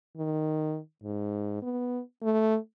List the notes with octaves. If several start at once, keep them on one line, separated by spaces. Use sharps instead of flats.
D#3
G#2
B3
A3